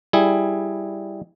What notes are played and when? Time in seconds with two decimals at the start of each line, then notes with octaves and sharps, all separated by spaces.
0.13 G3 E4 G#4